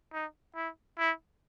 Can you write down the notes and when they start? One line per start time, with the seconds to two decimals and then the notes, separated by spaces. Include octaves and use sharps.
0.13 D#4
0.56 E4
0.98 E4